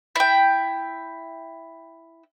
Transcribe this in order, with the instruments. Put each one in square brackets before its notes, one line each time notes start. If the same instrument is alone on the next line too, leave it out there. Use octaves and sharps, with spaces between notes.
[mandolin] E4 G5